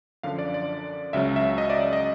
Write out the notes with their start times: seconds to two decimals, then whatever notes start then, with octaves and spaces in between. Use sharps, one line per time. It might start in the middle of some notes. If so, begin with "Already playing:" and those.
0.23 F#2 D3 F3 F5
0.39 D5
0.54 D5
1.13 C#2 C#3 F#3 E5
1.36 E5
1.58 D#5
1.70 D5
1.80 D5
1.93 D#5